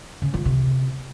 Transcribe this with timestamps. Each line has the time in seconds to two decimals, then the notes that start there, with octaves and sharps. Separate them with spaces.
0.22 C#3
0.34 F3
0.45 C3